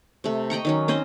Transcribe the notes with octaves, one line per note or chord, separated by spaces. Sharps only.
C3 A3
D#5 G5 A#5 C#6
D#3 F#3 C#4
C4 C#4 C5 D#5